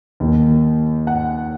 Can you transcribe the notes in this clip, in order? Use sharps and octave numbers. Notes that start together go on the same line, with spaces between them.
D#2 D#3
F#5